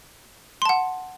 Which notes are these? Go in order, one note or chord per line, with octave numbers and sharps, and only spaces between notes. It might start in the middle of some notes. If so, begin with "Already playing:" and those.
F#5 A5 C6